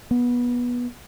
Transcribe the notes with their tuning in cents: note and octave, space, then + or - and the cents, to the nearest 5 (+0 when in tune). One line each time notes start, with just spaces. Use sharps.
B3 -20